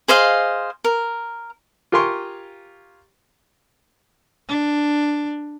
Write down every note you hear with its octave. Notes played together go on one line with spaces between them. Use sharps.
G#4 C5 D#5 F5
A#4
F4 G4 A#4 G#5 C6 C#6
D4